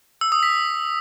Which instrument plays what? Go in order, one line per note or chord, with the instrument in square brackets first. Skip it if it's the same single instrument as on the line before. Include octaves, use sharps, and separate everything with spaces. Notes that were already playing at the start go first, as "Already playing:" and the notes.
[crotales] E6
D#6
B6